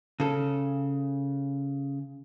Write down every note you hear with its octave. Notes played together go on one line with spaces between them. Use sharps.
C#3 A4